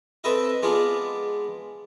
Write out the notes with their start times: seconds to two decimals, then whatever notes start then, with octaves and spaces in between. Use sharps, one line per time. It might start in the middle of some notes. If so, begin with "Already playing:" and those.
0.24 C4 A4 B4 D#5 E5
0.63 G#3 B3 D4 F4